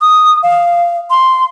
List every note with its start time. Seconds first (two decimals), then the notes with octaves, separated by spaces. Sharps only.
0.01 D#6
0.43 F5
1.10 C6